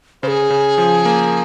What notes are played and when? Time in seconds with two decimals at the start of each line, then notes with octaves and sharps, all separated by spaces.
0.23 C#3 G#4 C5
0.50 C#3
0.78 F3
1.06 A#3